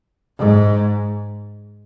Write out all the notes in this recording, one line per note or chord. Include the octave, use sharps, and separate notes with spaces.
G#2